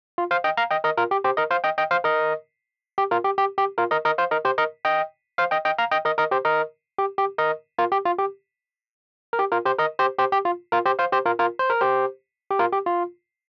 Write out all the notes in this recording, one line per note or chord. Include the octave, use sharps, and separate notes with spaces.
F4
C5 F5
D#5 G5
F5 A#5
D#5 G5
A#4 D#5
F4 A#4
G4
G4 C5
A#4 D#5
C5 F5
D#5 G5
D#5 G5
C5 F5
A#4 D#5
G4
F4 A#4
G4
G4
G4
F4 A#4
A#4 D#5
A#4 D#5
C5 F5
A#4 D#5
G4 C5
A#4 D#5
D#5 G5
C5 F5
D#5 G5
D#5 G5
F5 A#5
D#5 G5
A#4 D#5
A#4 D#5
G4 C5
A#4 D#5
G4
G4
A#4 D#5
F4 A#4
G4
F4
G4
A#4
G4
F4 A#4
G4 C5
A#4 D#5
G4 C5
G4 C5
G4
F4
F4 A#4
G4 C5
C5 F5
G4 C5
F4 A#4
F4 A#4
C5
A#4
G4 C5
G4
F4 A#4
G4
F4